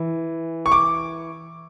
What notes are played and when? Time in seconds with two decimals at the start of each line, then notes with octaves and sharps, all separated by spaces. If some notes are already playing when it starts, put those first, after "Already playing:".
Already playing: E3
0.66 C#6
0.72 D6